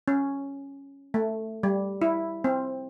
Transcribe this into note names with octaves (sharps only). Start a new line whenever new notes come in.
C#4
A3
G3
E4
C4